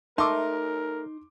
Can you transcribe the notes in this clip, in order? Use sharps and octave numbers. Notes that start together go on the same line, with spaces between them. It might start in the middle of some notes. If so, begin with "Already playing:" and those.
A3 D#4 A#4 C6 D6